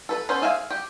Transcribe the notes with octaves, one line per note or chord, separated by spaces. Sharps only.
A4 B4
B3 C#4 A4 B4 C5
G#4 E5 F5 G5 G#5
G4